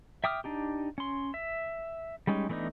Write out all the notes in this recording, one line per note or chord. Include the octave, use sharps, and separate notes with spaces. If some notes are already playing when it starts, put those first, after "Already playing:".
E5 G5 D6 D#6 F6
D4 D#4 G4
C#4 C6
E5
G3 G#3 C#4 D#4
E3 A3 B3 D4 D#4